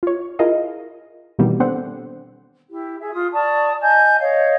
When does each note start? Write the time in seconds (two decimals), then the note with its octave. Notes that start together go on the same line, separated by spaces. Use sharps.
0.03 F4 C#5
0.39 E4 F4 G#4 A#4 D#5 F5
1.39 B2 D#3 E3 G3 B3 C4
1.60 B3 C4 D4 A4 C5 F#5
2.69 E4 G4
3.00 G#4 E5
3.12 F4 D#6
3.32 D5 A5 C#6 D#6
3.80 D#5 G#5 G6
4.18 C#5 D#5 F5